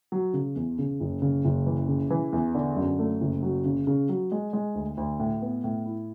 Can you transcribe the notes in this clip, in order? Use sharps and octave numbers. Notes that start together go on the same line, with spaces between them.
F#3
C#3
E2
C#3
F#1
C#3
F#1
E3
C#3
E3
E2
D3
F#2
A3
F#1
F#3
C#3
C#3
F#3
G#3
G#3
D2
D2
A2
B3
A2
E4